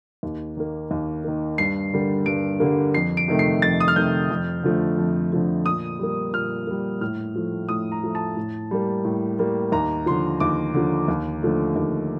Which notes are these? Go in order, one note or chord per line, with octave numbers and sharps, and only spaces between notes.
D#2
D#3 A#3
D#2
D#3 A#3
G2 C7
D3 G3 A#3
G2 D7
D3 G3 A#3
F2 C7
D7
C3 D#3 A3
C7
F2 A6
D#6
F6
C3 D#3 A3 G6
F2
D3 F3 A3
F2
D3 F3 A3
A#2 D#6
G3 A#3
A#2 F6
G3 A#3
A2 F6
F3 A3
A2 D#6
A#5
F3 A3
A5
A2
G3 A#3
A2
G3 A#3
D#2 A#5
D3 F3 C6
D#2 D6
D3 F3
D#2
D3 F3 A3
D#2